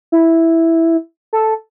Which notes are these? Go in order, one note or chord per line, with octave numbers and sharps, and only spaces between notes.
E4
A4